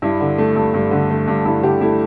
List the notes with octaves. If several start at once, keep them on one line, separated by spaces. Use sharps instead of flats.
G2 E4
D3
A3
G2
G2
D3
A3
G2
G2 E4
D3 G4
A3 E4